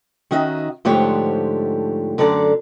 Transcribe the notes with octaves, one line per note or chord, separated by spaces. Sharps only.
D#3 C#4 D#4 F#4 D#5 E5
G#2 D3 F3 A3 G4 C#5
F#2 D3 A4 D5 A5 A#5